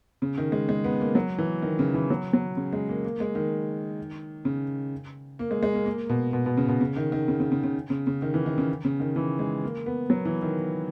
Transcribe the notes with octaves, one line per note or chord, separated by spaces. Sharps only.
C#3
D#3
G#3
G#3
B3
A#3
F#3
E3
D#3
C#3
E3
F#3
F#3
C#3
G#3
A#3
A#3
G#3
D#3
C#3
A#3
G#3
G#3
A#3
A#3
B2
B2
B2
C#3
B2
C#3
D#3
D#3
C#3
C#3
C#3
C#3
C#3
C#3
D#3
E3
D#3
C#3
C#3
D#3
E3
G#3
A#3
B3
F#3
E3
D#3